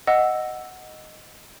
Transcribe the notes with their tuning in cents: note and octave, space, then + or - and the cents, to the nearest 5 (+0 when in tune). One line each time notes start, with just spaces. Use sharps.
D#5 +0 F#5 +0 E6 +0